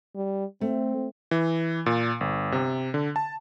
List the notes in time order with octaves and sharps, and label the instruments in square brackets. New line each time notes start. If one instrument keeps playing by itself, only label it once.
[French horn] G3
[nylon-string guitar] A3 [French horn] C4
[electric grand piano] E3
A#2
G1
C3
D3
A5